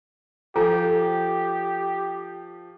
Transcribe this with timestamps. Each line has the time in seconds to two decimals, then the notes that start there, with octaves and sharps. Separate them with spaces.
0.56 F3 G4 A4 G#5 A#5